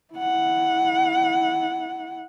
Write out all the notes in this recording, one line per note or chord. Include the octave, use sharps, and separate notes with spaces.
E4 F#5